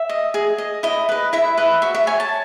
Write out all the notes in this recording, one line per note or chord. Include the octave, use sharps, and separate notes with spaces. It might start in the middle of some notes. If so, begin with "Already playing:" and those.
Already playing: E5
D#5
G#4
D#5
E4 D#5
B4 D#5
E4 E5
B4 D#5
F#4 E5
E5
C#5 G#5
A5